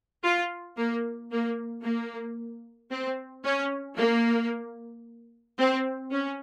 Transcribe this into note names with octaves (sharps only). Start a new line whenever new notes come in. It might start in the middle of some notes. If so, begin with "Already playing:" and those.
F4
A#3
A#3
A#3
C4
C#4
A#3
C4
C#4